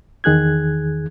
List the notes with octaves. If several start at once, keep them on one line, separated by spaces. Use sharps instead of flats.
E2 D#3 G#4 F#6 G#6